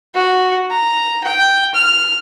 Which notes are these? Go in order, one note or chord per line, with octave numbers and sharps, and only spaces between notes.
F#4
A#5
G5
F6